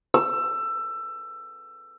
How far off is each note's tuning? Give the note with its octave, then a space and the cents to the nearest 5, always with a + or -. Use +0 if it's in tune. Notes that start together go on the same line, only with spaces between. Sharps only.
E6 +20